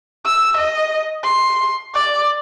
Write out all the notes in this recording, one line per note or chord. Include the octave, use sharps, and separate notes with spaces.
E6
D#5
C6
D5